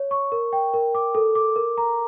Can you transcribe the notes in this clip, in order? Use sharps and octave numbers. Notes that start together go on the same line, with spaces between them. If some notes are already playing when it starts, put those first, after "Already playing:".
Already playing: C#5
C#6
A#4
G5
A#4
D6
A4
D6
A#4
A#5